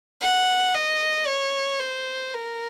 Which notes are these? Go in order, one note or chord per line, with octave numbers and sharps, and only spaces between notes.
F#5
D#5
C#5
C5
A#4